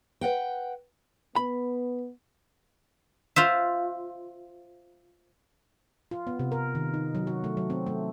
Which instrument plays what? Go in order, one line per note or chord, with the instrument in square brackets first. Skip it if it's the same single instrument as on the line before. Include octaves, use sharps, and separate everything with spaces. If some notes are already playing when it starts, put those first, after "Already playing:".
[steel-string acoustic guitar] B4 D#5 F#5 G5
[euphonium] B3 [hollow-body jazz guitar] B5
[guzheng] F4 C5 E5
[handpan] F4
B3
C3
A#4
D#3
D#4
F#3
F#4
A3
F#3
C4
A3